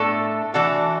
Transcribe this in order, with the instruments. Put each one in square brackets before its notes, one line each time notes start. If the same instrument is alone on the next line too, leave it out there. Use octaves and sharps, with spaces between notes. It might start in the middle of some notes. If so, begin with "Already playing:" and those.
Already playing: [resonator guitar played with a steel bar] A2 A3 D4 A4
E3 D4 F#4 A4